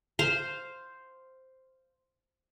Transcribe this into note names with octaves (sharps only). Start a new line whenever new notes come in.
C5 F5 C6